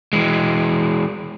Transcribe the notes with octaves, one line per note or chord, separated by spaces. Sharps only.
E3 G#3